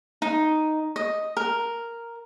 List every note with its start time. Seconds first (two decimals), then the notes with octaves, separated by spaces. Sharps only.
0.22 D#4
0.96 D#5
1.37 A#4